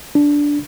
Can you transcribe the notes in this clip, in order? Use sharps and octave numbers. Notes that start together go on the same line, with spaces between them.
D4